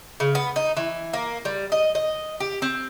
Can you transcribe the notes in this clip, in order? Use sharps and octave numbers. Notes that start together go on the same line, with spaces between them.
C#3
B3
D#4
E3
A#3
G3
D#5
D#5
G4
C4